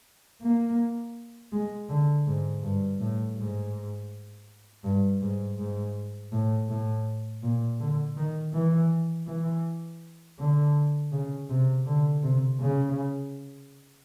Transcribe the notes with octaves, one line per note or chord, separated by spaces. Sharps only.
A#3
G#3
D3
G#2
G2
A2
G#2
G2
G#2
G#2
A2
A2
A#2
D3
D#3
E3
E3
D3
C#3
C3
D3
C3
C#3